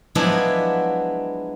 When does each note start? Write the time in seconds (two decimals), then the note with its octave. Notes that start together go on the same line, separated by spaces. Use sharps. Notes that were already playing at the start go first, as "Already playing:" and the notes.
0.15 F3 F#3 G#3 B3 D4 E4